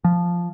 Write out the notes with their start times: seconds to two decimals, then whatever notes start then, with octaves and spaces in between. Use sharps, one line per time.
0.04 F3